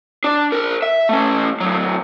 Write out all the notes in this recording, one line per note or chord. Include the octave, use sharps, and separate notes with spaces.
D4
A#4 C5
E5
A3 C#4
A2 F#3